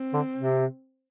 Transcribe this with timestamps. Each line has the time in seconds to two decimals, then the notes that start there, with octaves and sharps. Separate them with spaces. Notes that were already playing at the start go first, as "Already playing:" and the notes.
Already playing: C4
0.13 D3
0.37 C3